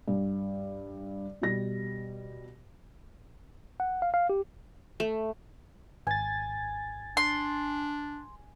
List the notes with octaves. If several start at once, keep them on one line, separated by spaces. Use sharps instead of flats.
G2
B2 G3 A#6
F#5
F5
F5
G4
A3
G#1 G#5 A6
D4 C6